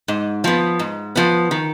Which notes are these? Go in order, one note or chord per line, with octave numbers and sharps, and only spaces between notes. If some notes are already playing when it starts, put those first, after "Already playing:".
G#2
F3 B3
G#2
F3 B3
D#3